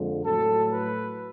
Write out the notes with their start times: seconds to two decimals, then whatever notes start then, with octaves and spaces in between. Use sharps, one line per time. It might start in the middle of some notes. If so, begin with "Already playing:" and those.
Already playing: F2 D3 F3 G#3
0.25 A2 F#3 A3 A4
0.70 B4